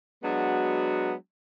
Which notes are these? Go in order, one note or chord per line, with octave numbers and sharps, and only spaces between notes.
F#3 G#3 B3 D4 F#4